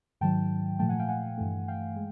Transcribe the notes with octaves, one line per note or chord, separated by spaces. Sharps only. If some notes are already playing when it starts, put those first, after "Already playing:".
G#2 D#3 F#3 G5 A5
A#2 F3 A3 G5 A5
F#5 G#5
F5 G5
F#5 G#5
G2 E3 A3
F5 G5
G#3